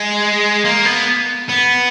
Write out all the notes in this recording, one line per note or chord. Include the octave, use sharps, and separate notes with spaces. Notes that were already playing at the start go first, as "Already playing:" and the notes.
Already playing: G#3
A#3
B3
B3